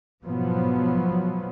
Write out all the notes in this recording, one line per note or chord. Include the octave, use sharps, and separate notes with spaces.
G#2 B2 F3 F#3 B3